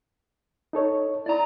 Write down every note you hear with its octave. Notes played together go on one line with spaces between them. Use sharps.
D#4 A4 C#5
E4 D5 A#5